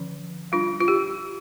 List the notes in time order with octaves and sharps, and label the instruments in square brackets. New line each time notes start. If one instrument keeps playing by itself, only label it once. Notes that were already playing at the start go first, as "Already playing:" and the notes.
Already playing: [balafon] D3 F3 C#4
G3 D4 F4
F4
G4